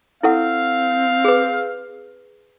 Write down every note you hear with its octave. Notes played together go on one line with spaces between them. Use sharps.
C4 E4 A4 F5 F#5
G#4 B4